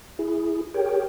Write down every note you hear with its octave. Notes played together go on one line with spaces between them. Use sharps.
E4 G#4
G4 G#4 A#4 C#5 G5